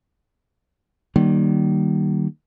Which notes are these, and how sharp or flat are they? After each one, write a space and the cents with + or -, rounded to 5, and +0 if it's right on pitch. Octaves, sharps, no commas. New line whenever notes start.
D#3 -25 G3 -40 A#3 +0